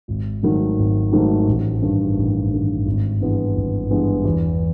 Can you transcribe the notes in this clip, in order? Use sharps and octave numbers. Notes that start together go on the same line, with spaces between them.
G#1
G#2 D#3 F#3 A3
G#1
G#2 D#3 F#3 A3
A1
G2 D#3
A1
G2 D#3
G#1
G2 E3 G#3 B3
G#1
G2 E3 G#3 B3
E2